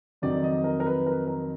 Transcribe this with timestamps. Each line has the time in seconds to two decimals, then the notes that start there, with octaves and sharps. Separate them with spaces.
0.22 F2 D#3 F#3 D5
0.44 D#5
0.64 A#4
0.80 A#4
0.86 B4
1.06 A#4
1.27 A#4